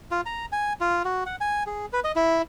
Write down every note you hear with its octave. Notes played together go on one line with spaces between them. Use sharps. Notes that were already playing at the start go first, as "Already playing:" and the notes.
F4
A#5
G#5
F4
F#4
F#5
G#5
G#4
B4
D#5
E4